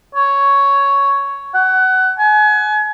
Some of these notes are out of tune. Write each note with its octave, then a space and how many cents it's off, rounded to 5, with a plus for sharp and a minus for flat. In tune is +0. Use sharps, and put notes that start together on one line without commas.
C#5 +5
F#5 +20
G#5 +35